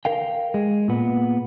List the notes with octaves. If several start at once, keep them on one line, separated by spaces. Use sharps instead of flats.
A#4 F5 G5
G#3
A#2 B3